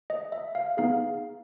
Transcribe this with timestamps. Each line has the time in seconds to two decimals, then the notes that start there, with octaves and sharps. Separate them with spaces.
0.10 D#5
0.32 E5
0.55 F5
0.77 B3 D#4 G#4 F5